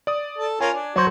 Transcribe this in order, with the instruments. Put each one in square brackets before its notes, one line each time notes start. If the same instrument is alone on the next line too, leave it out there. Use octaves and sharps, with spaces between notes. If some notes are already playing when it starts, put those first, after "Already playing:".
[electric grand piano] D5 D#6
[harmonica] A4
[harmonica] C#4 F4 A#4 [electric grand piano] G#5
[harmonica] D4
[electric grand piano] F#3 [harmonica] F#4 [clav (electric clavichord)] C5 C#5